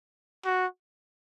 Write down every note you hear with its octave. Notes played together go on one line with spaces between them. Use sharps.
F#4